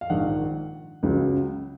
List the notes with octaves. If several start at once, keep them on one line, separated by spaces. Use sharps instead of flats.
F5
A#1 G#2 D#3 F#5
C#2 C#3 F#3